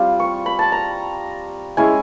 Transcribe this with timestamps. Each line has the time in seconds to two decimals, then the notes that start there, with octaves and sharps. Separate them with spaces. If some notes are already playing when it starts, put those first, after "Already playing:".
Already playing: G3 C4 F4
0.19 C#6
0.46 B5
0.59 A5
0.72 A#5
1.77 G#3 C#4 E4 G#5